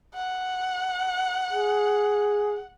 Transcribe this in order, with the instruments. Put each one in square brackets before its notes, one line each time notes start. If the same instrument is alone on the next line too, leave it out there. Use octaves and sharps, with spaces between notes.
[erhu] F#5
[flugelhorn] G#4